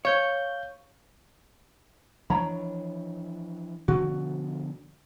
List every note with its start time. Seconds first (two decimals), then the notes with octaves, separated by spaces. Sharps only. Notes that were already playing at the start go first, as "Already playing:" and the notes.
0.05 C#5 F5 G6
2.30 E3 F3 D4 C#5 A#5 B5
3.88 B2 D3 F3 F#4